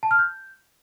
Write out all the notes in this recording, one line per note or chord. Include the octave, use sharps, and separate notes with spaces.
A5
F6
G6